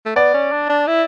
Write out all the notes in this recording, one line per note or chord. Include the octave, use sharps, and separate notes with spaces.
A3
B3 D5
C#4
D4
D4
E4